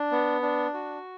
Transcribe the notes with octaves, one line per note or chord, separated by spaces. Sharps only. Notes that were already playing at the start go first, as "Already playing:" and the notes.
Already playing: D4
B3
D4
F#4